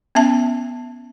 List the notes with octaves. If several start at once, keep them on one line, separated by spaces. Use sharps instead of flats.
B3 C#4 E5 A5